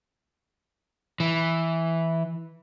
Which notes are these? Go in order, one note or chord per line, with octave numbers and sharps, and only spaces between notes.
E3